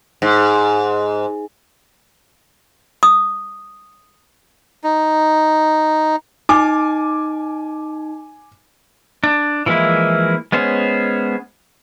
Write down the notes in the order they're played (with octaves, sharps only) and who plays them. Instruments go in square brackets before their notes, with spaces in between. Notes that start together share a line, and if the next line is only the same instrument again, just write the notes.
[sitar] G#2
[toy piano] D#6
[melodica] D#4
[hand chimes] D#4 [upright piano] G#5 D6
[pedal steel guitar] D4
E3 F3 G#3 A#3 E4
G#3 B3 C#4 C5